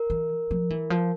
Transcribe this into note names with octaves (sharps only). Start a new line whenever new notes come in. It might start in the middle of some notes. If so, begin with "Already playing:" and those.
Already playing: A#4
E3
F3
E3
F3